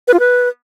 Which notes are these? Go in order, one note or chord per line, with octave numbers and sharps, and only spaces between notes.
B4
F4
B4